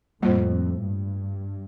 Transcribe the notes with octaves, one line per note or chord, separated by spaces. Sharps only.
F2 A2 G3 A#3 F4 C5
G2